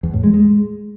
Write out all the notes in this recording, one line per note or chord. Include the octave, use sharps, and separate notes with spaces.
E2
A2
G#3
G#3